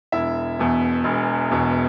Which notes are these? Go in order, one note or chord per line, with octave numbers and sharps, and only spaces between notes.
E1 E4 E5
E2 B2
E1
E2 B2